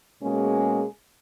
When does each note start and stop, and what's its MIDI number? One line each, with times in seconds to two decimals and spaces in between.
0.22 0.85 47
0.22 0.85 56
0.22 0.85 58
0.22 0.85 61
0.22 0.85 68